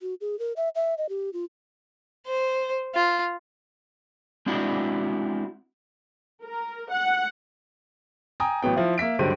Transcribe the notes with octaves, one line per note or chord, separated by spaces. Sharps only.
F#4
G#4
A#4
E5
E5
D#5
G4
F4
C5
F4
G#3 C4 D4 E4 F#4
A#4
F#5
G5 G#5 A#5 D#6
A1 F#3 B3 G5
F3 E4 F4
A#3 E5 B6 D7
C#2 G2 D3 F#3 C5 D#7